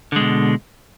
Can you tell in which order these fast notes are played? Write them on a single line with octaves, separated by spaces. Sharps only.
D3 G#3 B2